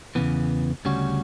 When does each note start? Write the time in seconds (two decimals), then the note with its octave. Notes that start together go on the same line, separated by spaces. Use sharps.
0.15 E2 C#3 E3 B3
0.85 D2 C#3 G3 C#4 F#4